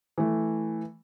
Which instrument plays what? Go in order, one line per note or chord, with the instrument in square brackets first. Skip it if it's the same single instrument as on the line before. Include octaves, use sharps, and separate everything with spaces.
[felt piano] E3 A3